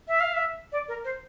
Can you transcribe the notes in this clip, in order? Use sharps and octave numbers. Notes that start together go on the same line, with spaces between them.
E5
F5
E5
D5
A#4
C5